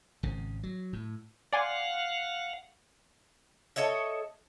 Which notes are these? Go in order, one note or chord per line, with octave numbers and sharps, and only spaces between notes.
G#1 C#3
F#3
A2
D5 F5 F#5 G#5 C6
A4 C#5 D#5 E5